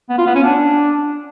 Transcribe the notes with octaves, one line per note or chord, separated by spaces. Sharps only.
B3
F4
B3
C#4
D4